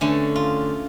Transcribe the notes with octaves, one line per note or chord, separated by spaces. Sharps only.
D3 A3 C#4
F4